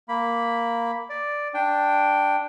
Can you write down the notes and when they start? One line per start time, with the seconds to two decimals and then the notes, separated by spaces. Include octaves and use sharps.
0.09 A#3 B5
1.10 D5
1.54 D4 G5